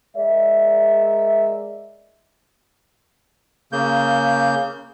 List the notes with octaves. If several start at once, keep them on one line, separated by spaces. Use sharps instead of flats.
G#3 A#4 D5 E5
C#3 A#3 G6